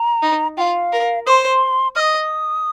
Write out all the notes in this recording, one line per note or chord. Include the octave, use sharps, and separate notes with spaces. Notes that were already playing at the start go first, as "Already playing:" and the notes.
Already playing: A#5
D#4
F4 F5 G5
A#4
C5 C6 D#6
D#5 D#6 F6